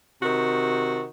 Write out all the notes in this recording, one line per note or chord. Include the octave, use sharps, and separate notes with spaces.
C3 D#3 F#4